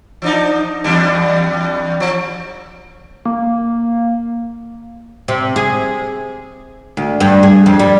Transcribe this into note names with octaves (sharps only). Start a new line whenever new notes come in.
F3 D4 D#4
E2 G3 D4
F3
A#3
C3
G#4
D2
G2
G#4
F2
G3